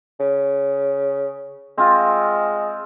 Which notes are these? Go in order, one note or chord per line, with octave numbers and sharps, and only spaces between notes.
C#3
G#3 C4 F4